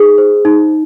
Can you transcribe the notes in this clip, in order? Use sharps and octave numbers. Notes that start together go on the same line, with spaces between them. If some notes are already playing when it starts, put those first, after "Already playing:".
Already playing: D#4 G#4
C5
D#4